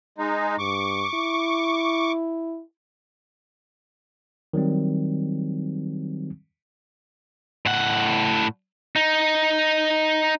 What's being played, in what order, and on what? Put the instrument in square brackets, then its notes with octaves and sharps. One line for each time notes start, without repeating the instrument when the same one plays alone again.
[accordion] G#3 D#4
[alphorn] G2 [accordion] C#6 D6
[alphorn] E4
[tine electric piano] D#3 F#3 G3 C4
[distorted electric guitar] A2 F#5
D#4